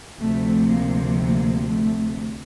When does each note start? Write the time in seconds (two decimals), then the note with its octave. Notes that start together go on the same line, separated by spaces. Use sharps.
0.20 D2 C3 F3 A3
0.70 A#3
1.20 A#3
1.70 A3